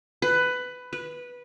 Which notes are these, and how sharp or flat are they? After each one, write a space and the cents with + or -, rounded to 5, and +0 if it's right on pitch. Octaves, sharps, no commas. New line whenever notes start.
B4 +15
B4 -10